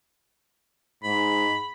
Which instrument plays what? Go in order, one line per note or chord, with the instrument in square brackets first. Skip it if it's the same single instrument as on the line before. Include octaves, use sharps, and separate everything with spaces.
[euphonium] G#2 [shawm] B5